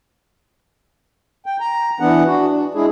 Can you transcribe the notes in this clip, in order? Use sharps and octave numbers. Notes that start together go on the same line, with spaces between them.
G5
A#5
E3 B3 D4 F#5
D4 F#4
D4
G#3 D4 E4 G#4